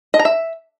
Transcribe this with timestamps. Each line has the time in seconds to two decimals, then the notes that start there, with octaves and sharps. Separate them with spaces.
0.14 D#5
0.19 A#5
0.25 E5